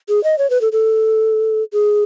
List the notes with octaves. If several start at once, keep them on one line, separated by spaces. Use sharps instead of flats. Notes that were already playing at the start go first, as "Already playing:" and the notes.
G#4
D#5
C#5
B4
A4
A4
G#4